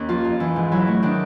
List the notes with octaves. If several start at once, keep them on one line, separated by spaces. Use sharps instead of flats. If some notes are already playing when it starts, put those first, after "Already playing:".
Already playing: D#2 C#4
F3 F4
F2
E3
G#2
F#3 E4
A3
D#3 D4